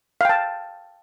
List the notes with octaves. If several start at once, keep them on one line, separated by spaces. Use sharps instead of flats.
F5 G5 A5